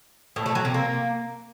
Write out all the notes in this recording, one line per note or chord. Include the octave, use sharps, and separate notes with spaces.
A2
A3
F#3
C3
A#3